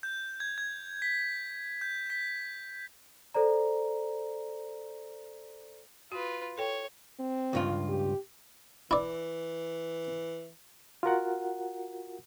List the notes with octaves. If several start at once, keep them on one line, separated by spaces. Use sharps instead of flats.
G6
G#6
G#6
B6
G6
B6
A4 C5 D5 A#5
F4 F#4 B4
A4 C#5 G5
C4
C#2 G2 F4
G4
E3 E4 D5
F4 F#4 A#4 F#5